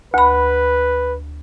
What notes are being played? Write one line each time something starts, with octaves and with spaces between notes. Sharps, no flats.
D2 B4 B5